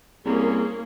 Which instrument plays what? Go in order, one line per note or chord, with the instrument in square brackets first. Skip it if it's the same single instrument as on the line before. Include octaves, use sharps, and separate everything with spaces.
[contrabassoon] C2 [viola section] A#3 C#4 [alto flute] G#4